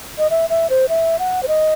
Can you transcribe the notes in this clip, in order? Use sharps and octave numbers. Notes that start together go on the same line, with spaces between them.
D#5
E5
E5
C5
E5
F#5
C5
D#5